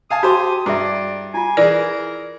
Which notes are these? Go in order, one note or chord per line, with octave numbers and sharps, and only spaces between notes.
F5 G#5 A5 D#6
F#4 G4 C5 A5 D6
G2 E4 G#4 D5 E5
E4 F4 G#5
E3 G#4 A#4 D5